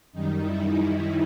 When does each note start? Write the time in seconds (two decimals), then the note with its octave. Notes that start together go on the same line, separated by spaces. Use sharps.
0.13 F#2 D#3 G3 D#4
0.43 E4